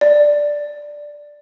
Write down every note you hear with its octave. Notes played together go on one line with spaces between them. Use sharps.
D5